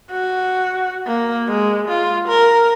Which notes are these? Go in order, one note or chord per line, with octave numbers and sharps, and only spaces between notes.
F#4
A#3
G#3
F4
A#4